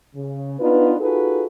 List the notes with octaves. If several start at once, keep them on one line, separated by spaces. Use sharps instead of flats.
C#3
B3 D4 D#4 F4 B4
D#4 F4 F#4 G#4 A4 B4